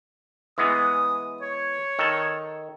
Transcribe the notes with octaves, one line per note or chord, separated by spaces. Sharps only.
E3 G#3 B3 D#6
C#5
D#3 A4